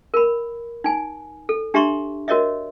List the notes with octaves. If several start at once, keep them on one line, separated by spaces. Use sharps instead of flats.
A#4 B5
D#4 G#5
A4
D4 G4 E5 A#5 C6 C#6
F#4 A#4 C#5 D#5 E5